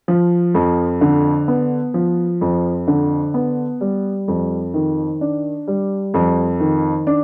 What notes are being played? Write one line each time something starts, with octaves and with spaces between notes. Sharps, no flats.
F3
F2
D3
B3
F3
F2
D3
B3
G3
F2
D#3
D4
G3
F2
D#3
D4